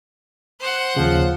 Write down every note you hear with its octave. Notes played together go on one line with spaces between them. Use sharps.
C5 F#5
D#2 C#3 F3